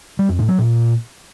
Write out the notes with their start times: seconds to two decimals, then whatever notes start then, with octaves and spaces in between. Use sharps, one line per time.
0.19 G3
0.29 F2
0.39 A2
0.49 F#3
0.59 A#2